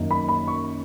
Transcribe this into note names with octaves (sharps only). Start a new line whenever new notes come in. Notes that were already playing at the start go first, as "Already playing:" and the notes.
Already playing: F#2 D#3 A#3 D#4
B5
B5
C#6